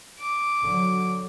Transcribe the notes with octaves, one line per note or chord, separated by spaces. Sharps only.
D6
D3 F#3